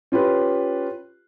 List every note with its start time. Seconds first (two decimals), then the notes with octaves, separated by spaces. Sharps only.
0.12 C#4 F4 G4 B4